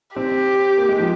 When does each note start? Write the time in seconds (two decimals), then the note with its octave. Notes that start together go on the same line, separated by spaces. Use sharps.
0.16 C4 G4
0.78 A#3
0.89 G#3
0.99 F3